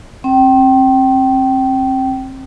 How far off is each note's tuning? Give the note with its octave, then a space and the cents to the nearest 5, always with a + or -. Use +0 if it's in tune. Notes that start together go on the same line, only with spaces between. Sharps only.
C4 +30 G5 -25